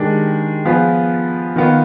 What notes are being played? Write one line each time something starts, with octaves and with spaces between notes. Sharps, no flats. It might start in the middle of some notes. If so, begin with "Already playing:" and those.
Already playing: D#3 G#3 D4 G4
F3 B3 F4 G#4
D#3 B3 F4